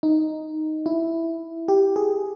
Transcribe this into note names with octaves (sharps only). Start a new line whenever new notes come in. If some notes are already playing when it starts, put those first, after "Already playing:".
D#4
E4
G4
G#4